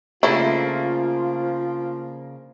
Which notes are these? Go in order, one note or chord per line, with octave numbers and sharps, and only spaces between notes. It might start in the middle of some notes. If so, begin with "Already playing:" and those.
C#3 F3 A3 A#3 D4 E4 F4